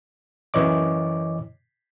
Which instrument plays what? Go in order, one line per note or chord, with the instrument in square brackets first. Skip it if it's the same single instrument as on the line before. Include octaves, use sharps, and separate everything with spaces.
[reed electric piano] F#2 E3 C#5 D#5 D6